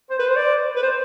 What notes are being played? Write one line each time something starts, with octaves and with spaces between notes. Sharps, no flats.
C5
B4
C5
D5
B4
C5